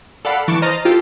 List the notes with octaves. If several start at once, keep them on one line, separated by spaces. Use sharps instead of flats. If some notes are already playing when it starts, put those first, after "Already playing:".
A4 D5 F5 F#5 B5
E3 A5 C#6 D6
C5 D#5 A#5 F6 A6 A#6
F4 G4 A4